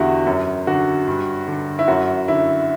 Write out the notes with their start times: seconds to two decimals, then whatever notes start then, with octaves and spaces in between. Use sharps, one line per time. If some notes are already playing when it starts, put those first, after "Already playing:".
Already playing: E2 D3 E4 F#4 G4
0.27 F#2
0.67 D3 F#4
1.08 G2
1.48 D3
1.79 E4
1.88 F#2 F#4
2.28 D3 E4